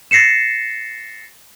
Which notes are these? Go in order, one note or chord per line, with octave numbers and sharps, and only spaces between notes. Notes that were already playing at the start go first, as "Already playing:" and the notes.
A6 A#6 C7 C#7 E7